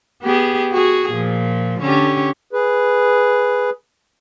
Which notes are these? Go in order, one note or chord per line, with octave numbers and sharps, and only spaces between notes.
B3 G4 G#4
F#4 G#4
A#2 F3
D3 C#4 G4
G#4 B4